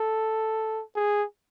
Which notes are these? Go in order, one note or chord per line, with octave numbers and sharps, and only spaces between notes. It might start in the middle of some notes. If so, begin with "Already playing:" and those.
Already playing: A4
G#4